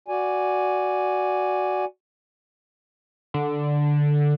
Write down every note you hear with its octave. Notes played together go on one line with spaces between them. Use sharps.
F#4 D5 G#5
D3